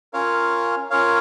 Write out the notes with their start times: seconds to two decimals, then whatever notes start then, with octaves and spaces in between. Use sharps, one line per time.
0.13 C#4 F4 A#4 C#5 F5
0.90 C#4 F4 A#4 C#5 F5